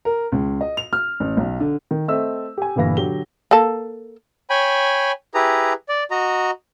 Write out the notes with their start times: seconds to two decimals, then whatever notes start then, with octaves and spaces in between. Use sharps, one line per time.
0.05 A#4
0.32 C#2
0.61 D#5
0.77 F7
0.93 F6
1.20 A1
1.37 B1
1.60 D3
1.91 D#3
2.08 A3 C4 D#5 E5 E6
2.57 G4 G#5
2.76 G1 G2 A#2 E3 F5 A#6
2.97 D3 F#3 G4 G7
3.51 A#3 A4
4.50 C#5 G5 G#5 B5
5.34 E4 G4 G#4 B4 A#5
5.89 D5
6.11 F#4 D#5 A#5